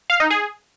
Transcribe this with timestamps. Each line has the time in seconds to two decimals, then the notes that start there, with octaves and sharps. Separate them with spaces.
0.10 F5
0.20 D#4
0.30 G#4